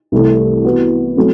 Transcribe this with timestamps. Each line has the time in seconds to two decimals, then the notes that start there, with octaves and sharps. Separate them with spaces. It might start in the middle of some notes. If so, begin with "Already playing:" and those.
0.12 C2 C3 E3 A3
0.64 E3 B3 F#4
1.17 F#3 A3 C4